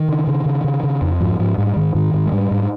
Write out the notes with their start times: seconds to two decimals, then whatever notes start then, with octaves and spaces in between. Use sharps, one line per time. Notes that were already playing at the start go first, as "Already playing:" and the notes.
Already playing: D#3
0.08 C#3
0.27 C#3
0.46 C#3
0.64 C#3
0.83 C#3
1.02 F2
1.21 G#2 F3
1.39 G#2 F3
1.58 G#2 G3
1.76 G#2 D#3
1.95 G#2 D#3
2.14 G#2
2.26 G#3
2.32 G#2 G3
2.51 G#2